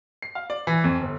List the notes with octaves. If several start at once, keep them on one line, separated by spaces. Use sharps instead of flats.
C7
F5
D5
E3
F2
G1